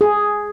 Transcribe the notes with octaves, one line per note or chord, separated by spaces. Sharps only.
G#4